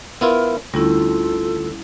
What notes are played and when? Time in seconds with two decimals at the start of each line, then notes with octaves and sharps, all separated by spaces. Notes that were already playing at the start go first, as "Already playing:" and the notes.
0.21 B3 E4 F4 A#4
0.74 D2 G3 C#4 E4 F4 A4